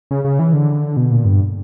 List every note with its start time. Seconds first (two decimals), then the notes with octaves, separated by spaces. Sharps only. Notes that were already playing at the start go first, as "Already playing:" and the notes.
0.11 C#3
0.24 C#3
0.39 E3
0.53 D3
0.97 B2
1.12 A#2
1.25 G2